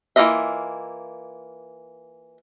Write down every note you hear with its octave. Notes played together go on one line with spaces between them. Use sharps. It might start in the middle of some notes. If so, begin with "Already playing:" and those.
E3 A#3 F4 D#5 E5